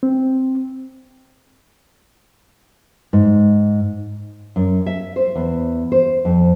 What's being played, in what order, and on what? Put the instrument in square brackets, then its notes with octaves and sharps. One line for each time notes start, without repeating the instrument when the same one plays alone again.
[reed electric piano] C4
[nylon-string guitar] G#2
F#2
E5
C5
E2
C5
F2